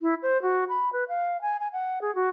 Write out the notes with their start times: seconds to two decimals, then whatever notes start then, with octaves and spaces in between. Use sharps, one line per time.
0.01 E4
0.23 C5
0.42 F#4
0.69 B5
0.93 B4
1.09 F5
1.42 G#5
1.60 G#5
1.73 F#5
2.02 G#4
2.15 F#4